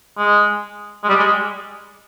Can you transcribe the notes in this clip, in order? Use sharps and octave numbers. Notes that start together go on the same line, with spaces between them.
G#3
G#3
G3
G#3